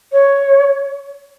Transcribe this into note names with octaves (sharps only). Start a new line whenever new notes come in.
C#5